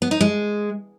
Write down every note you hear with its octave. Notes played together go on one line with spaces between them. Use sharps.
B3
D#4
G#3